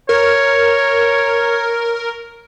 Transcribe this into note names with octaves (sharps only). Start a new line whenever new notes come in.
A#4 C#5